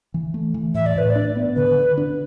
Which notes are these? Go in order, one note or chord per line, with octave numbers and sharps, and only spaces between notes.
E3
A3
E3
A2 E5
D5
A2 B4
D5
D4
B3
D3 B4
D3
D4